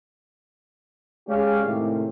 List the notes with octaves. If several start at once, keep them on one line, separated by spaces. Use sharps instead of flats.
G#3 C#4 G4 C#5 D5 F5
A2 C3 D#3